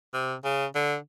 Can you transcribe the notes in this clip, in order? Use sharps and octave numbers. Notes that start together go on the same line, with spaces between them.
C3
C#3
D3